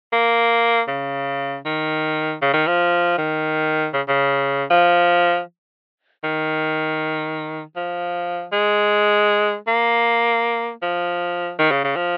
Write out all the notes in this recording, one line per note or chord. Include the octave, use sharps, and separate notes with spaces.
A#3
C#3
D#3
C#3
D#3
F3
D#3
C#3
C#3
F3
D#3
F3
G#3
A#3
F3
D#3
C#3
C#3
F3